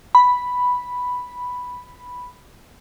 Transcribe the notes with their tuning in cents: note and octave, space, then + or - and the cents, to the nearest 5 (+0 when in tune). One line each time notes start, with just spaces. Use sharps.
B5 +0